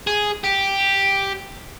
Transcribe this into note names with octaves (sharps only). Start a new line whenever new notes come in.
G#4
G4